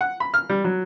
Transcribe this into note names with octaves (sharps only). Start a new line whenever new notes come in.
F#5
B5
F6
G3
F#3